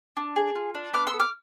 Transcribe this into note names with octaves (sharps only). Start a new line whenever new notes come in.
D4
G#4
F4
D4
B3 D6 F6
C6 E6
A4
D6 F6